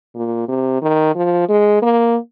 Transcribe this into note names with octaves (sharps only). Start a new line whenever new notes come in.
A#2
C3
D#3
F3
G#3
A#3